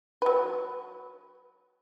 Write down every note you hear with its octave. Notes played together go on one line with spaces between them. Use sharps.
F#3 B4